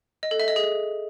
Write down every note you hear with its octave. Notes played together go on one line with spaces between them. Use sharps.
D#5
A4
E5
D#5
G#4